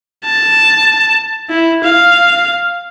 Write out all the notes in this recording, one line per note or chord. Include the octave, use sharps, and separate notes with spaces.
A5
E4
F5